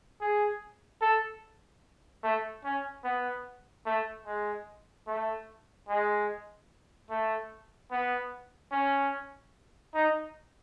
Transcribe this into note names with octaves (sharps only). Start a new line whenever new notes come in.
G#4
A4
A3
C#4
B3
A3
G#3
A3
G#3
A3
B3
C#4
D#4